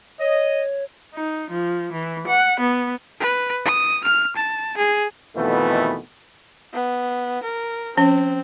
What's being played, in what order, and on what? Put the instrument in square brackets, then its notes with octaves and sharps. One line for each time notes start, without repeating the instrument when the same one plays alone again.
[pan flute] C#5 [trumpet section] D#5
[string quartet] D#4
F3
E3
F#5
B3
[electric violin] B4
D#6
F6
A5
G#4
[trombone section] F2 B2 D#3 E3 A3 B3
[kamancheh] B3
A#4
[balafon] F3 C#4 [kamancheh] C4